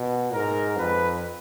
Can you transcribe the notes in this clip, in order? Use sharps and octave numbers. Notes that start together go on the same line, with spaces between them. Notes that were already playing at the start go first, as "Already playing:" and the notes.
Already playing: B2
G#2 A#4
F2 B4